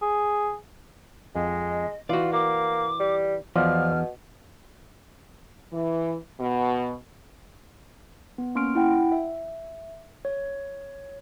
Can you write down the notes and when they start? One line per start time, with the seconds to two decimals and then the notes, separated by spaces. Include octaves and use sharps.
0.02 G#4
1.35 F2 G#3 D#5
2.09 E3 F4 F#4 D5
2.33 A#3 D6
3.00 G3
3.56 E2 B2 F3 F4 D5 F6
5.73 E3
6.40 B2
8.38 B3
8.55 A#3 C#4 C6 C#6 F6 D7
8.75 E4 F#5 G5
9.12 E5
10.25 C#5